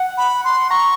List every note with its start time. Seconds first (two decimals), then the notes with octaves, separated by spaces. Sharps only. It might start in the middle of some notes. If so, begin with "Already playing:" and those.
Already playing: F#5
0.17 B5
0.44 C6
0.70 A#5 C#6